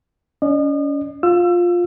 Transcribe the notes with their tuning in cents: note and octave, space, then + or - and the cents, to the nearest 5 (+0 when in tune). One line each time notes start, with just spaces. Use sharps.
C#4 +35 D#5 -40
F4 +10 E6 +25